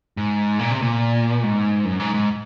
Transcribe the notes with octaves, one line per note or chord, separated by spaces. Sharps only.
G#2
A#2
C3
A#2
G#2
F#2
G#2
G#2